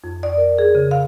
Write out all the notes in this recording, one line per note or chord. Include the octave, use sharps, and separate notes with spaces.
F2
D5
A#4
G#4
C#3
F5